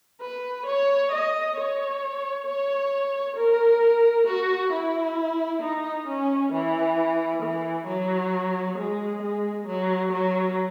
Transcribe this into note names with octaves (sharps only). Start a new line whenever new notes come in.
B4
C#5
D#5
C#5
C#5
A#4
F#4
E4
D#4
C#4
E3
E3
F#3
G#3
G#3
F#3
F#3